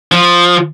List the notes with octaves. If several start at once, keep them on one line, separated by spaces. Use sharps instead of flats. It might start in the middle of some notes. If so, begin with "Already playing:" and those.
F3